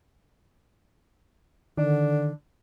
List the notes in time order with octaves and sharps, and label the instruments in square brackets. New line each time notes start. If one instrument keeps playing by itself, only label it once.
[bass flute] D3 [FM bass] D#3 [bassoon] D4